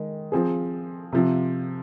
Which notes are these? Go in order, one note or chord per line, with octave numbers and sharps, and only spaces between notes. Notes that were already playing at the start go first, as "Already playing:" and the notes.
Already playing: D#3 G#3
F3 C4 G#4
C3 F3 C4